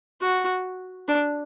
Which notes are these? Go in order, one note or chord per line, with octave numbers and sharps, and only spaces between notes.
F#4
D4